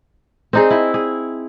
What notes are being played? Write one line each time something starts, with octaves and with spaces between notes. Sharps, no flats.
C4 D#4 G#4
E4
G#4